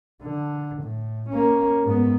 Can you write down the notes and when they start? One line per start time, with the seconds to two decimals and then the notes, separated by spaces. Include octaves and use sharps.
0.23 D3
0.82 A2
1.30 A#3 C#4
1.84 G#2 B3